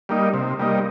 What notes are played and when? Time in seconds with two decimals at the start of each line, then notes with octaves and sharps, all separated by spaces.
0.09 G3 A#3 D#4
0.34 C3
0.59 G3 A#3 D#4